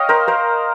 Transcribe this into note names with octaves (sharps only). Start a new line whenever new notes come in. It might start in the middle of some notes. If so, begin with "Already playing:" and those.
Already playing: C#5 D#5 F5 G5
A#4 C5
A#4 C5